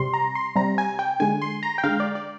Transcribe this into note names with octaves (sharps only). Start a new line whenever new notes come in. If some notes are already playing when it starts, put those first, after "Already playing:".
Already playing: C3 G3 C6
A#5
C6
C3 G3 A#5
G#5
G5
D3 G#3 G#5
C6
A#5
G5
D3 G#3 F5
D5
D5